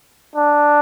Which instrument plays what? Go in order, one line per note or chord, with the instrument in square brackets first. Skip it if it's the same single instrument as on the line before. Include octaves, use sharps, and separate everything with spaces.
[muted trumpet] D4